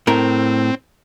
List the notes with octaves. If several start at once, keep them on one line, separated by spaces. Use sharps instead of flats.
A2 C4 A#4